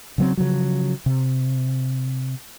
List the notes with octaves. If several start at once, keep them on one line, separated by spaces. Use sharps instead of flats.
C#3 F#3 C4
C#3 F3 F#3
C3